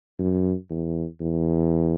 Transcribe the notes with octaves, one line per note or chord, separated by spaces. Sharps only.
F#2
E2
E2